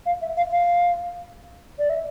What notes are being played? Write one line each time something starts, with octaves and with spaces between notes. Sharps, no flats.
F5
E5
F5
F5
D5
E5